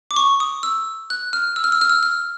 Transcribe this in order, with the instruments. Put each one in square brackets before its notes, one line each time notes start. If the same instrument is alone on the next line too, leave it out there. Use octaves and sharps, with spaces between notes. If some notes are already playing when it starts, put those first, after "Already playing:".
[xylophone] D6
C#6
D#6
E6
F#6
F6
E6
F6
E6
F6
E6
F6